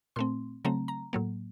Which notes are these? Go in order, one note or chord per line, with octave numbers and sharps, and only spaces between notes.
A#2 A3 C4 C6
C#3 F#3 A3 C4 A#5
A#5
A2 F#3 A#3